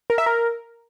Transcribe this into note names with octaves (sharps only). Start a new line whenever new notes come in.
A#4
E5
A#4